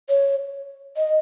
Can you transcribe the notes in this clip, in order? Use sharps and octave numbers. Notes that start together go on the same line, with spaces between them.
C#5
D#5